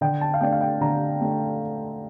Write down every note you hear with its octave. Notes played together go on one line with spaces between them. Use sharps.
D3 G5
A5
F5
A3 D4 G5
F5
G5
D3 A#5
A3 D4